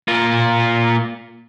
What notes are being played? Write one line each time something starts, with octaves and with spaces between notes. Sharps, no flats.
A#3 F4